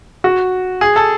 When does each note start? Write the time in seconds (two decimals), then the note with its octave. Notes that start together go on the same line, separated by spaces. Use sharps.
0.24 F#4
0.81 G#4
0.96 A4